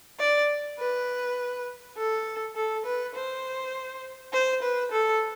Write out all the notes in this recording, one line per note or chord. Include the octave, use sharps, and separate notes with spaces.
D5
B4
A4
A4
B4
C5
C5
B4
A4